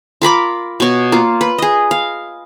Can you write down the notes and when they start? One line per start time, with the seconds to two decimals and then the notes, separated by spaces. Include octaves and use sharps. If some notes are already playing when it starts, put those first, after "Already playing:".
0.22 F4 A#4 B5 D6
0.80 B2 C#5
1.12 A#3 F4
1.41 B4
1.58 G#4 D#5
1.91 F5